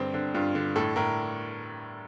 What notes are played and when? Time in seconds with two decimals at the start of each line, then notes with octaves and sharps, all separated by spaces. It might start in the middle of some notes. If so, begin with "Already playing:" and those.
Already playing: G2 D3 C4
0.14 D3
0.35 G2 F4
0.55 D3
0.76 A2 A4
0.96 A2 A#4